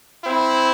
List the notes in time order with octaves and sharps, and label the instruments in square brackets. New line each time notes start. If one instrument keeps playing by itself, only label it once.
[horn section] C4 E4